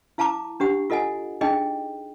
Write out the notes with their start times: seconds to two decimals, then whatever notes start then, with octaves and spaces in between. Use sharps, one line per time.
0.18 E4 F5 A5 A#5 D6
0.60 D4 G4 F#5
0.90 F4 A4 D#5 F#5 G#5
1.41 D4 D#4 G#4 D#5 G5